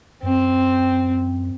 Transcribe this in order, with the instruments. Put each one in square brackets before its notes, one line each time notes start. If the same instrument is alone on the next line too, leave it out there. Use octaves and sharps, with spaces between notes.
[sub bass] F#2 [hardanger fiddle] C4